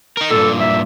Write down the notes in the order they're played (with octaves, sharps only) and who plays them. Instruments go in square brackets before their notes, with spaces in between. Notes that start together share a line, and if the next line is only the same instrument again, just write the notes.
[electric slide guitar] D#4 A#4
[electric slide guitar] G2 A#2 [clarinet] A4
[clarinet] E5